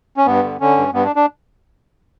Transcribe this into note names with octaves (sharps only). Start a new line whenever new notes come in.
C#4
G2 B3
D3
D3 C#4
G2
G2 B3
D4
D4